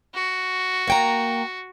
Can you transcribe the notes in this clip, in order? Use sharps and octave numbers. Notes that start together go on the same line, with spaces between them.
F#4
A#3 G5 A#5